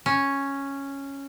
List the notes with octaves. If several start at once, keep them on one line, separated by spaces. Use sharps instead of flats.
C#4